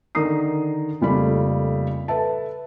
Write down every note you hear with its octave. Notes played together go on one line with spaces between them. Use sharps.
D3 D#3 A#4 A#5 D#6 C7
F2 C#3 G3 A3 A#3 B5
A4 B4 E5 A5